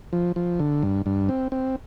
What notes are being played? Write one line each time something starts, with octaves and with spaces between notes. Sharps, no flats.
F3
F3
D3
G2
G2
C4
C4